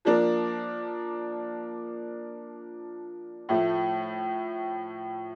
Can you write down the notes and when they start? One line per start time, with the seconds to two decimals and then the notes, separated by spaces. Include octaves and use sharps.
0.05 F3 A#3 D4
3.49 A2 F3 A3